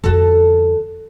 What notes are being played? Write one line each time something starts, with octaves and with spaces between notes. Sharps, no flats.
F2 D3 F#4 A4